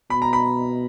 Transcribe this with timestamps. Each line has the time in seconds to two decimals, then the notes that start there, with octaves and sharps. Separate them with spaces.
0.10 B2 B5
0.22 A#5
0.33 B5